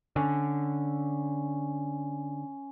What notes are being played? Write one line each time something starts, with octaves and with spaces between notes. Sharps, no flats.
D3 C#4